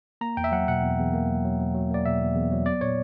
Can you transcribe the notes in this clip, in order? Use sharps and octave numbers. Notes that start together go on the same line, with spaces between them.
A#3 A#5
E2 G5
E5
F#3 F#5
B2 F#5
E2
E2
A#3
F#3
F#3
F#3
F#3
A#3 D5
B2 E5
E2
E2
F#3
B3 D5
A#2 C#5